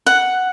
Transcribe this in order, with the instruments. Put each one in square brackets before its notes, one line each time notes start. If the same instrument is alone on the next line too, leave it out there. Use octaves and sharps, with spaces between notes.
[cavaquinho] F#5